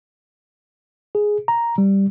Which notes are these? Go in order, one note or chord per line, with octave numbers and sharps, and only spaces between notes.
G#4
A#5
G3